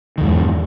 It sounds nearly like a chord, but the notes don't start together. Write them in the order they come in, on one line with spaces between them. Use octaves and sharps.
D#3 E2 G#2